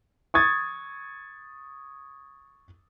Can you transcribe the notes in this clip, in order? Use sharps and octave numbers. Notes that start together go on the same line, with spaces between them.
C#6 D#6 G#6 A6